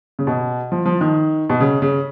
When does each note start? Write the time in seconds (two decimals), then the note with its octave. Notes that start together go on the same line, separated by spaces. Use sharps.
0.19 C#3
0.27 B2
0.72 F3
0.86 F3
1.01 D#3
1.50 B2
1.60 C#3
1.82 C#3